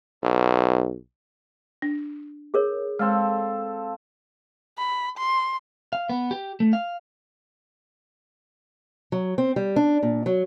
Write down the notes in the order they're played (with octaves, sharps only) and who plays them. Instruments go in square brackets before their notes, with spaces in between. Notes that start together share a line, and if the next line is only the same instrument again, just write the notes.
[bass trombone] B1
[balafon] D4
[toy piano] G#4 A#4 C#5
[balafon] G#3 [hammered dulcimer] C4 A4 F5
[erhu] B5
C6
[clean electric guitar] F5
B3
G4
A3
F5
[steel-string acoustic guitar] F#3
C4
G3
D4
A#2
F#3